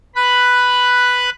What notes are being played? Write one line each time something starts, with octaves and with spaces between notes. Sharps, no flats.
B4 B5 F#6